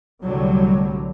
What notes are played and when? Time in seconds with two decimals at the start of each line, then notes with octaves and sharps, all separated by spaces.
0.24 C2 A2 D3 F#3 G3